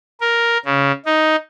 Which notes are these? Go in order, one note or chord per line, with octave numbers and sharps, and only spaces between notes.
A#4
C#3
D#4